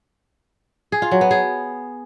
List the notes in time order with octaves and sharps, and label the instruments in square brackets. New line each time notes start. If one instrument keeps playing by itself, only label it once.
[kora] G#4
F4
F#3
B3
G#4